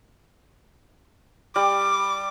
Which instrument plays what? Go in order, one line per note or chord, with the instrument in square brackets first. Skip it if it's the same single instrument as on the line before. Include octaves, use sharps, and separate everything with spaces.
[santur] G3 [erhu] D6